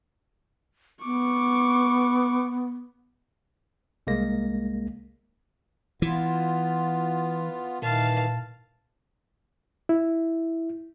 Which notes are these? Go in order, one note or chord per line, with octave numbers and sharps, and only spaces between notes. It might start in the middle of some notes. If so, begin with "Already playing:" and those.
B3 C#6 D6
C2 G#3 A#3 A#6
E3 B3 F4
A#2 D#3 E3 F5 A5
E4